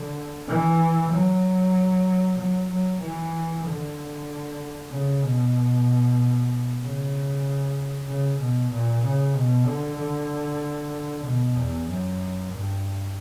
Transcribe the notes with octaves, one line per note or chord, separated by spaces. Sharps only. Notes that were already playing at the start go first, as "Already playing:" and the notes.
Already playing: D3
E3
F#3
F#3
F#3
E3
D3
C#3
B2
C#3
C#3
B2
A#2
C#3
B2
D3
D3
B2
E2
F#2
G2